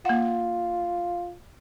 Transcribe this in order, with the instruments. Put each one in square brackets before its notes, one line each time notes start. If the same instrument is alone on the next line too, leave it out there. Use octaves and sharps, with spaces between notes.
[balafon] A#3 F#5 [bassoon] F4